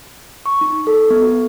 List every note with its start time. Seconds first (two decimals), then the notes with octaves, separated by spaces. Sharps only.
0.46 C#6
0.61 D#4
0.87 A4
1.10 B3
1.22 F#4